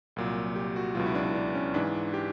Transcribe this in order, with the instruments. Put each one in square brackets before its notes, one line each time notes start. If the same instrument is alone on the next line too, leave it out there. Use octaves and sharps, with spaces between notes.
[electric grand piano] C2 A#2 F#3
G4
F#4
C#2 B2 F#3 F4
E4
D4
D4
D4
C#4
G#2 E3 D4
D4
G4